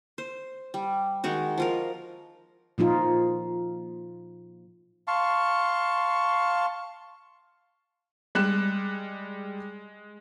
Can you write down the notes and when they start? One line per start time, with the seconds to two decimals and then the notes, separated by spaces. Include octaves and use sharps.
0.18 C5
0.74 G3
1.24 D#3 G#3 D#4 F#4
1.58 F3 F4 A#4
2.78 A#2 F3 D#4 F4
5.08 F5 A5 C6 C#6
8.35 G3 G#3 F#6 E7